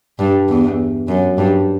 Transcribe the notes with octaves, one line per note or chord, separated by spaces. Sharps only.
G2
E2
F#2
G2